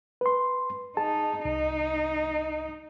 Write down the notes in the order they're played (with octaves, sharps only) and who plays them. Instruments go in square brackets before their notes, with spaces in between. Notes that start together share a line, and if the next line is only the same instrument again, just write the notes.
[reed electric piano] B4 C6
[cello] D#4 [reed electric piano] G#4 A5
[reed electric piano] C2 [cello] D#4